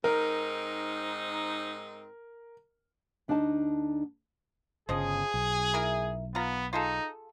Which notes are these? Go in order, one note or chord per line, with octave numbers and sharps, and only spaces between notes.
G#2 C4 D#4 A#4
D2 D4 D#4 D#5 A5
G1 C#3 F3 G#4 D#5
B1
E4 A#4
B3 F4 A#5
D#4 F4 G#4 A4